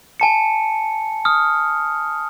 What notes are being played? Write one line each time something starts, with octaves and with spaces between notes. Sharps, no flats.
G#5 A5 C#7
D#6 F6